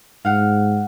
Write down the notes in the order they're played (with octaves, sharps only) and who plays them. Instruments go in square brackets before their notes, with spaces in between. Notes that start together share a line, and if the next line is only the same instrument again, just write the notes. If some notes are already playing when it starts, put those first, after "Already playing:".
[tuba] G#2 [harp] F5 F#5